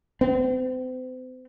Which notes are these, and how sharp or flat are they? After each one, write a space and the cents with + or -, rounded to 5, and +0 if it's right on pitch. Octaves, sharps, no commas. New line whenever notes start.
C4 -40